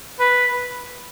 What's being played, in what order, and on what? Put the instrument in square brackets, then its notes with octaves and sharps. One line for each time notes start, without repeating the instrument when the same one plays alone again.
[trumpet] B4